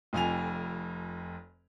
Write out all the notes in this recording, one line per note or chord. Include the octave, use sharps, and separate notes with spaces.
F1 F2 G#5 F7